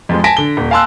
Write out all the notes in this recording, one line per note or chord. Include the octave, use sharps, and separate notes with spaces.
F2 F3 G#3
G#5 A5 A#6 B6 D7
D3 G7
D#1
F5 G#5 A5 C6 E6 F#6